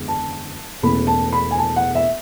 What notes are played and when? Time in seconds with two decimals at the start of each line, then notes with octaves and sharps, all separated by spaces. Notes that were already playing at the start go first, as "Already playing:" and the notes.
Already playing: F#1 E2 D3 G#3 B3
0.08 A5
0.82 E1 E2 B2 A3 C#4 B5
1.07 A5
1.33 B5
1.51 G#5
1.58 A5
1.76 F#5
1.95 E5